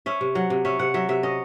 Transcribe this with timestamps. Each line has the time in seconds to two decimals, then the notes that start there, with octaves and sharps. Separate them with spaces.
0.06 C#4 E5
0.21 C3
0.35 F#3 F#5
0.50 C3
0.65 C#4 E5
0.79 C3 F#5
0.94 F#3 E5
1.09 C3 E5
1.23 C#4 D#5